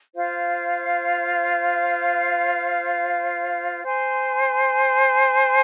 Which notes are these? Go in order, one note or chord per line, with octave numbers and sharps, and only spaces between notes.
F4 C5 F5
C5 G#5 C6